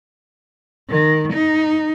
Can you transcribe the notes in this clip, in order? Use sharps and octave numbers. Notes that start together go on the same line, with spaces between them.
D#3
D#4